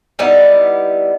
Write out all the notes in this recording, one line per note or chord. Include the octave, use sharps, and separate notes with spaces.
G3 B3 D#4 E4